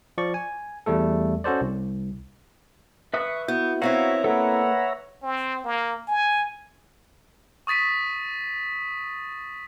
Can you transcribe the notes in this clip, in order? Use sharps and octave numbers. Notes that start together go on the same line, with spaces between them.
F3 D5 C#6
G#5
E2 G3 A3 A4
C#4 F#4 A4 C5 D5
C2
B4 E5 C#6 D#6
B3 E4 F#4 G6
B3 C4 E4 F#4 C#5 E5 F5 A#5
A#3 A4 B4 F#5
C4
A#3
G#5
C#6 D#6 A6 B6 D#7